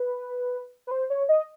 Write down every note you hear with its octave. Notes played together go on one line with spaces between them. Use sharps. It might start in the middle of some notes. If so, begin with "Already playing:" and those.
Already playing: B4
B4
C5
C#5
D#5